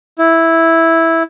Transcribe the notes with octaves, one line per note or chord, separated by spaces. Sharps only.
E4